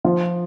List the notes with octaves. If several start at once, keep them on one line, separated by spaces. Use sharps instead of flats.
F3 F4